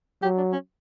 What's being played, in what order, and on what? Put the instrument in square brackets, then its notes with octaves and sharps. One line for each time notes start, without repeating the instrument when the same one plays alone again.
[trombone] F#3 [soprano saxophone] G4
[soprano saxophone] D4
C#4